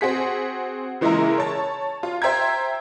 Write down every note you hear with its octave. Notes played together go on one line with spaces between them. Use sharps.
C4 F#4 G#4 B6
C#3 E3 G#3 A#3 E4 A#4
C#5 A5
F4
C5 E5 G5 A#5 G#6